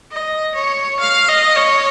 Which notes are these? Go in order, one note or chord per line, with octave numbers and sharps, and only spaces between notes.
D#5
C#5
F5
D#5
C#5